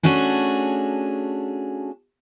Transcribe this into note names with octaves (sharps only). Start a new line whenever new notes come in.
A3 C#4 D4 F#4 G#4